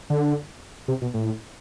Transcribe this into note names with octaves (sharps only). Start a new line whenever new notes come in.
D3
C3
B2
A2